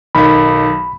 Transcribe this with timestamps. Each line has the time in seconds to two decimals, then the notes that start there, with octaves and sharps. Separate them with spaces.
0.15 B1 D#3 B5